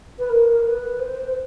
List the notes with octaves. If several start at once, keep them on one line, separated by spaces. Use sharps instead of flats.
B4
A#4
B4
C5